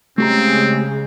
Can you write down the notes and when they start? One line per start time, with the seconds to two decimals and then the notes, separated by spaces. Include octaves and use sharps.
0.18 C#3 G#3 A3 C4 G4 A#5